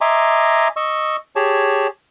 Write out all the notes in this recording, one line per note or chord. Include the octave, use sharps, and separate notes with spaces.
D#5 E5 G#5 A#5 C6 D6
D#5 C#6 E6
G4 G#4 C#5 A5